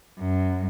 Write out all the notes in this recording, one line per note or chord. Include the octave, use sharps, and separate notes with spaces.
F#2